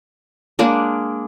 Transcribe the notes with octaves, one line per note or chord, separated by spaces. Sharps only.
G#3 A#3 D4